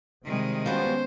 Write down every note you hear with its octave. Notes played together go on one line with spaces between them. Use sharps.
C3 D#3 G3 G#3
F3 G3 B3 C#4 F#4 C5